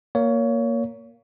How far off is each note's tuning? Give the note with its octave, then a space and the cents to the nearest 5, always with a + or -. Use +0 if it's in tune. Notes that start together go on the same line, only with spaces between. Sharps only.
A#3 +0 C#5 +20